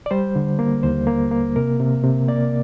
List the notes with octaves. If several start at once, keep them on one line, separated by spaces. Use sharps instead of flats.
D5
G3 C5
D3
A#3
D#2 C5
A#3
A#3
C3 A#4
C3
C3
A#3 D5